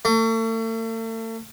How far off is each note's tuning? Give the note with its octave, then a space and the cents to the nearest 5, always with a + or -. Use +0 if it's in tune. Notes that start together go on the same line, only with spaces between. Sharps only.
A3 +40